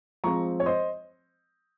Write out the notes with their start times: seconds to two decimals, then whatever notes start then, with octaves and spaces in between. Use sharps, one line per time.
0.24 F3 G#3 C4 A#5 C#6
0.60 C#5
0.66 C5 D#5